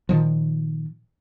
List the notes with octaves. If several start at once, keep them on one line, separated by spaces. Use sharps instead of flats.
A#2 D#3 F3